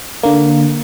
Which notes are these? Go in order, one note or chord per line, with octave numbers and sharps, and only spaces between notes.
D3 A#3